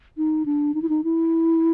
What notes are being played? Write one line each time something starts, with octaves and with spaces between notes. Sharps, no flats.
D#4
D4
D#4
E4
D#4
E4